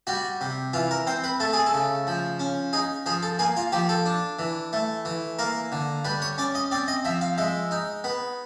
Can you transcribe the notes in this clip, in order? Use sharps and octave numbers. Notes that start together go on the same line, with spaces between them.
G3 F#4
C3
E3 F4
A#4
C4 C5
B4
A3 A4
G#4
A4
C#3
F3
C#4
D#4 G#4
F3 G#4
A4
A#3 G#4
F4
F3 G4
A4
D4
E3
A3
E3
A#3 A#4
D3
G3 B4
C#5
C#4 D5
D#5
C4 D5
D#5
F3 E5
F5
G#3 E5
D#4
B3